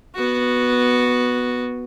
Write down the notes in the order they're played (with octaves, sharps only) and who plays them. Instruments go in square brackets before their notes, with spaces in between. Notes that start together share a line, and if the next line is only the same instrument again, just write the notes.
[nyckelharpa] B3 F#4